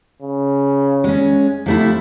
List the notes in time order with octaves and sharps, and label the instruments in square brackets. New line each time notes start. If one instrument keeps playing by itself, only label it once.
[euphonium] C#3
[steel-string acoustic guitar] G#3 C#4
[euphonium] C3 [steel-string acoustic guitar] F3 A3 E4